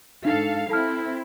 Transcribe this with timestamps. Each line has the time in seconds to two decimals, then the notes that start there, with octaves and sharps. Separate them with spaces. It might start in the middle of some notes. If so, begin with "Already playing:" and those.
0.25 G#2 D4 D#4 A4 F5
0.69 C4 E4 A4 A5 F6